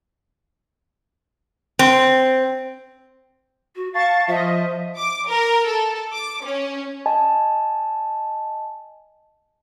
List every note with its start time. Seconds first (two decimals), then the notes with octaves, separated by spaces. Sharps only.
1.79 C4
3.76 F#4
3.94 F5 A5 C#6 A6
4.28 F3 D#5 E5
4.96 D6
5.28 A#4
5.67 A4
6.12 D6
6.43 C#4
7.06 D#5 G#5 A5